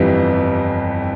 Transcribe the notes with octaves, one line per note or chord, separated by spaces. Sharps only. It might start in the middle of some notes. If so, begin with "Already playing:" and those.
Already playing: G1 F2 E3 G3